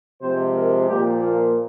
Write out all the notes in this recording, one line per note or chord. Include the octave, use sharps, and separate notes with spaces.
C3 F3 G#3 C5
A#4
A#2 F3 A#3 G4
F4